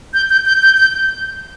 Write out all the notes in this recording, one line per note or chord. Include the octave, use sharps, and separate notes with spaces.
G6
G6
G6
G6
G6